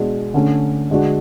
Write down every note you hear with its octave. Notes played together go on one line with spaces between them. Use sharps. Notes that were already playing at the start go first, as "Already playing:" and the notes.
Already playing: B2 G#3 D4 F#4
D3 A3 C#4
D3 G#3 D4 F#4